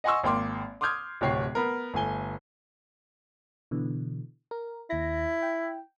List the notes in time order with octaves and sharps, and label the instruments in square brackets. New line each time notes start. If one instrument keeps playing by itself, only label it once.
[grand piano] D#5 F#5 G#5 C6 C#6 E6
G#1 A#3 G5 C6 D6
C6 D6 D#6 F6 G6 G#6
D1 C3 F#4 C#5 G5 C7
B3 A#4
G1 A3 G#5 G7
[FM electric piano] B2 D3 E3
A#4
[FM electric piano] D#2 A#6 [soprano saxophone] E4
[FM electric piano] G5